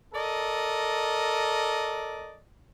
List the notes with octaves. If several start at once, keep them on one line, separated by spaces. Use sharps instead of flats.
A4 A#4 D5 D#5